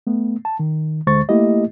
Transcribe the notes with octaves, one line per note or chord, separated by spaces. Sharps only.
A3 B3
A5
D#3
D2 D3 G#3 C5 C#6 A6
A3 A#3 E4 G4 D#5